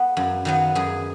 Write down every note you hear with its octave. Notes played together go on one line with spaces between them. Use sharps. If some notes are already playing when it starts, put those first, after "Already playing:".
Already playing: B3 G#4
F#2
D#3 F#3 B3
F#2 G#4